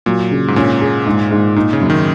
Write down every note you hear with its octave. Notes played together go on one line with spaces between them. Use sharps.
A#2 F#3
C#3
G#2
A#2 C#4
G#4
G#2
G#2
A#2 D#4
C#3
F#2
D#3